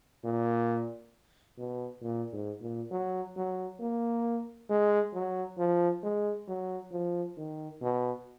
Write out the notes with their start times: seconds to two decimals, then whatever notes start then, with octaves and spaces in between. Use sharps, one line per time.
0.24 A#2
1.58 B2
2.02 A#2
2.33 G#2
2.62 A#2
2.91 F#3
3.36 F#3
3.81 A#3
4.69 G#3
5.14 F#3
5.58 F3
6.03 G#3
6.48 F#3
6.92 F3
7.37 D#3
7.82 B2